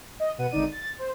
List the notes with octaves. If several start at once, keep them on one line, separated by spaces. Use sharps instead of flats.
D#5
B2 B3 F#5 D#7
G#1 D3 D#4 D5 D#7
A6
C5